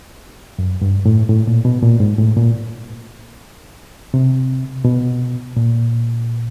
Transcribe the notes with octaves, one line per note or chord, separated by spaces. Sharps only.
F#2
G2
A2
A2
A#2
B2
A#2
G#2
A2
A#2
C3
B2
A#2